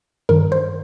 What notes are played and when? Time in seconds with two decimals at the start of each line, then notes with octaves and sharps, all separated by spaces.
0.29 G2 D#3 A#4
0.52 C5